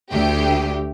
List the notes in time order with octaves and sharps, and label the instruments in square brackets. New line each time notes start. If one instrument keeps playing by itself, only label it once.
[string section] D2 G4